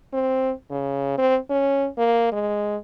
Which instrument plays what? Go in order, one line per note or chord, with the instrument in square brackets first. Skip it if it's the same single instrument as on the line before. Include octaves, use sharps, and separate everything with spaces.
[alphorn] C4
C#3
C4
C#4
A#3
G#3